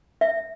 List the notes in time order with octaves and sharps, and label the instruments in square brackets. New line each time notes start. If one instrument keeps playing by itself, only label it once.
[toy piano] E5